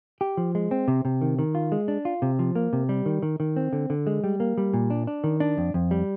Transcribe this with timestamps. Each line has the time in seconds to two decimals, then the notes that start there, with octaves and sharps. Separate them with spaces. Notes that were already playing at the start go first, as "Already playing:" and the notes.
0.21 G4
0.37 F3
0.55 G#3
0.71 C4
0.88 C3
1.05 C3
1.21 D#3
1.39 D#3
1.55 F4
1.72 G#3
1.88 D4
2.05 F4
2.22 C3
2.39 F3
2.55 A#3
2.73 C3
2.89 G3
3.06 D#3
3.23 D#3
3.40 D#3
3.56 C4
3.73 D3
3.90 D3
4.07 G#3
4.24 G3
4.40 A#3
4.58 G3
4.74 A#2
4.90 D4
5.07 D4
5.24 D#3
5.40 D4
5.57 F2
5.74 F2
5.91 G3